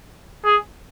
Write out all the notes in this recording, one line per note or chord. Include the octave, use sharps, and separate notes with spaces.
G#4